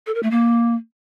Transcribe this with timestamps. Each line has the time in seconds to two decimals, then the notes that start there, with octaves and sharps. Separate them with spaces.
0.07 A4
0.15 A#4
0.23 A3
0.31 A#3